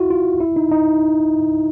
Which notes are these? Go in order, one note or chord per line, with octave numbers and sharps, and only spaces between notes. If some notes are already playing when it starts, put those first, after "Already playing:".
Already playing: E4 F#4
F4
E4
D#4
D#4